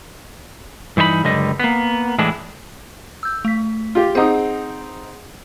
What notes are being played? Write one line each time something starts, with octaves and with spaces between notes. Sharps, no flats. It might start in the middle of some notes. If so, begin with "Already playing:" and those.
G2 E3 D#4 C5 B5
C#2 F#2 D3 G3 D#5
A#3 B3
A2 E3 G#3 D4 E4
E6 G6
A3 B6
F4 G4
C4 D#4 G#4 F#5 D#6